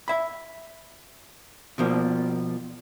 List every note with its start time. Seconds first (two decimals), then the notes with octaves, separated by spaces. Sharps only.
0.08 E5 B5
1.78 B2 F3 A#3